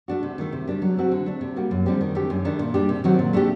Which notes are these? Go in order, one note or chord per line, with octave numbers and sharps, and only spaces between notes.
A3 D4 F#4
C3
D#3 A3
C3
G3 D4 G4
F#3
A3 C4 F#4
D3
A3 D4
C3
G3 A#3 F#4
F#2
D3 G3 C4 G4
D#3
A3 D4 G4
F#2
D#3 A3 D4
A#2
G3 D4 G4
C3
D#3 F#3 C4 F#4
A#2
A3 D4 G4